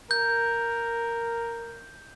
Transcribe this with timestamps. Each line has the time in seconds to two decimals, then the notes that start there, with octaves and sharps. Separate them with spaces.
0.11 A#4 G6